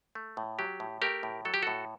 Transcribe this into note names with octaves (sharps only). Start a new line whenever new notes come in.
A3
A2
F#3 G4
A2
A3 G4 A#4
A2
F#3 A4
G4
A2 F#4 A4